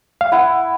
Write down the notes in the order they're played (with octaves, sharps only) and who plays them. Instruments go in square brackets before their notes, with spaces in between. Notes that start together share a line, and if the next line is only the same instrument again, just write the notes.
[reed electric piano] F5
[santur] E4 [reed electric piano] F#5